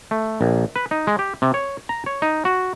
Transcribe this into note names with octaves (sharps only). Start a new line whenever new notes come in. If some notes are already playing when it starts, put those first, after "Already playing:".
A3
A#1
B4
D#4
G#3
G4
C3
C#5
A#5
C#5
D#4
F#4